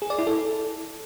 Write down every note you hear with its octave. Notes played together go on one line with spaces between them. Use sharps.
G#4
D5
E4
A4